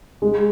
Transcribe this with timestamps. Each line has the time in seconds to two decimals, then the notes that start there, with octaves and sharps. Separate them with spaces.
0.22 G#3